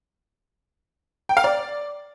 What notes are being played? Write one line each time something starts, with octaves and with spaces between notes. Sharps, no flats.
G5
F5
D5